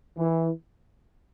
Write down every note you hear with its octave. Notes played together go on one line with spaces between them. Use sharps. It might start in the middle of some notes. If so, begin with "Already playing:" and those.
E3